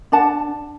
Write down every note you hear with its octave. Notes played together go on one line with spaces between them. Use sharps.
D4 F#5 A5